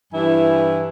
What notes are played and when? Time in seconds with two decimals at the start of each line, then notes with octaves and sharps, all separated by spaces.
0.13 G2 E3 E4 G#5